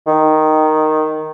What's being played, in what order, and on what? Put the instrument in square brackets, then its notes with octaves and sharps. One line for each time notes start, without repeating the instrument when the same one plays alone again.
[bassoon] D#3